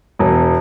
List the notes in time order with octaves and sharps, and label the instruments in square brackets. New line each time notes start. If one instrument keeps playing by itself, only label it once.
[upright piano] E1